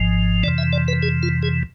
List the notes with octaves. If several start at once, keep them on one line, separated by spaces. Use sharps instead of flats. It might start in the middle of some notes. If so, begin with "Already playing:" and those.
Already playing: G#1 G#2 F3
F2 C3 E3 D5
E5
D5
B4
G#4
F4
G#4